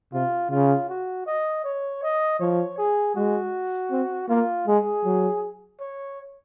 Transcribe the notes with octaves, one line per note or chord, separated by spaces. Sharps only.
C3 F4
C#3 F4
F#4
D#5
C#5
D#5
F3 C#5
G#4
G#3 F#4
C4
A#3 F4
G#3 G#4
F#3
C#5